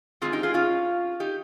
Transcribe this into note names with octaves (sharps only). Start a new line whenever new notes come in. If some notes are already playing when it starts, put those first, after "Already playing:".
G#2 F3 C4 F4 G#4
D#4 G4
F4 G#4
C#4 F4
D#4 G4